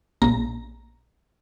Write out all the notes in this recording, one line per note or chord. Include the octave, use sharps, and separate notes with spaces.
A#1 A#5